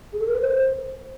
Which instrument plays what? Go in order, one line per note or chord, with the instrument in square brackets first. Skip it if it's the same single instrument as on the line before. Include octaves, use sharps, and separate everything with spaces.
[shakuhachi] G#4
A4
A#4
B4
C5